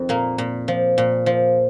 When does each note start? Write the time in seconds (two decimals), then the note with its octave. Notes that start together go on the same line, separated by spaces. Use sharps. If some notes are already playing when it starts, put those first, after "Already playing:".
Already playing: F2 D#3 C4
0.09 A#2 A#3
0.38 A#2
0.68 F3
0.98 A#2
1.26 F3